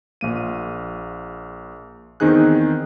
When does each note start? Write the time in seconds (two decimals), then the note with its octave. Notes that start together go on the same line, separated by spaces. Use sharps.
0.21 A#1 A#3 D#7
2.20 E2 D#3 C4 D#4 G#4 F#6